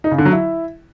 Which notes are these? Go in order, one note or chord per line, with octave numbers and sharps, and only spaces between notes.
D#4
C#3
D3
F#3
E4